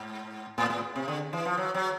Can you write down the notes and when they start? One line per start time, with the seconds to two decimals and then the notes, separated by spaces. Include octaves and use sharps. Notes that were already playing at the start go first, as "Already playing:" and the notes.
Already playing: G#2
0.58 A2
0.70 A2
0.96 C3
1.08 D3
1.33 E3
1.45 F3
1.57 F#3
1.74 F#3